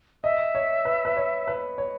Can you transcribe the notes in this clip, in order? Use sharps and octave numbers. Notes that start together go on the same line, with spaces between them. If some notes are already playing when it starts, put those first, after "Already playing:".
D#5 E5
C#5
B4
B4
C#5
B4
C#5